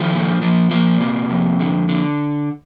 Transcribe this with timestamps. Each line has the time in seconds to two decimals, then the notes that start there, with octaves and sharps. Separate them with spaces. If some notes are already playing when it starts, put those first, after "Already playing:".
Already playing: D#3 F3 A3
0.13 A#2
0.42 F3
0.71 A#2 F3 A#3
1.01 C3
1.31 F2
1.60 D3
1.89 D3